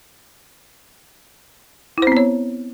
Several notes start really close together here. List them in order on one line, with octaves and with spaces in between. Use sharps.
E4 C5 C4 B3 C#5